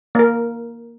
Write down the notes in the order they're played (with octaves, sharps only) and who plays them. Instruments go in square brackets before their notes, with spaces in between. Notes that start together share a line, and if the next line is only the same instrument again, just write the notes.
[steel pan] A#3 A#4